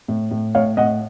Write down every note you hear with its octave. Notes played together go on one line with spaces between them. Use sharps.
A2
A2
A2 C#5 F5
A2 D#5 F#5